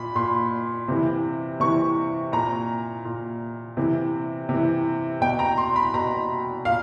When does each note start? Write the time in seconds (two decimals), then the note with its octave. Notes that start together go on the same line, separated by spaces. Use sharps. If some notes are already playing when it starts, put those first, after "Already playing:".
Already playing: A#2 B5
0.15 A#2 C6
0.88 C3 E3
1.60 C3 E3 C#6
2.32 A#2 A#5
3.05 A#2
3.77 C3 E3
4.49 C3 E3
5.21 B2 G5
5.39 A#5
5.58 C6
5.76 B5
5.94 B2 A#5
6.65 A#2 F5